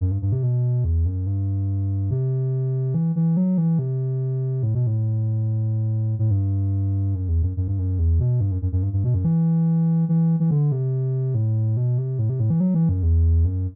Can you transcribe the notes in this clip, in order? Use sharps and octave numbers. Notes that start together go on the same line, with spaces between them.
F#2
G2
G2
C3
B2
E2
F#2
G2
C3
E3
E3
F#3
E3
C3
A2
B2
A2
A2
G2
F#2
E2
F#2
F#2
G2
F#2
E2
B2
G2
F#2
F#2
F#2
G2
G2
B2
F#2
E3
E3
E3
D3
C3
A2
B2
C3
A2
C3
A2
E3
F#3
E3
F#2
E2
F#2